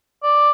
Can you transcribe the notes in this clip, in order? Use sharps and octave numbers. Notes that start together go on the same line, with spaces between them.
D5